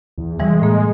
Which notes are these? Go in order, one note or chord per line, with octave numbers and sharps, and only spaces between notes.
E2
C3 E3 G3 G#3
A2 A#3